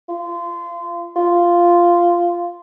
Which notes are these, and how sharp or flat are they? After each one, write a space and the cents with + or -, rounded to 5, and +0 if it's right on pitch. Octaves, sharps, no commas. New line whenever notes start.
F4 -25
F4 -5